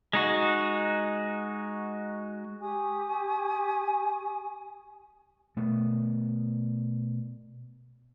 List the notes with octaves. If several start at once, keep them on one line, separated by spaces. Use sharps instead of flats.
G#3 D#4 F#4
G4 G#5 C#6 D#6
B2 A3 B3